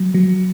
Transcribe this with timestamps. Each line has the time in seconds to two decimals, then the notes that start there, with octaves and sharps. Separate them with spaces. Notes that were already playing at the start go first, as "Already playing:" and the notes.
Already playing: F#3
0.14 F#3